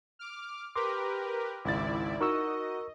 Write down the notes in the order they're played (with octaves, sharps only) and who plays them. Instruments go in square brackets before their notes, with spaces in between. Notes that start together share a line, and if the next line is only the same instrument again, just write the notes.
[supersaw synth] D6 F6
[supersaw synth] G4 A#4 B4 [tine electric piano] C6 D6
[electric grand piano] G#1 C#2 A6 [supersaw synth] E4 D5
[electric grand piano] D#4 F#4 [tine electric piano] A#4 C#6 E6 [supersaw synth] D#5